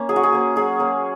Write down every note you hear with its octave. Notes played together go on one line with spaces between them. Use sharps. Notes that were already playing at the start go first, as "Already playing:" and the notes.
Already playing: A#3 C#4
F#3 G#4
F#4
G#4
A#3 C#4
F#3 G#4
A#3 C#4